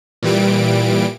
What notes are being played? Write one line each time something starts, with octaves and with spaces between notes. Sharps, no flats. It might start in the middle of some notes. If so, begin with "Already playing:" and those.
A#2 E3 G3 D7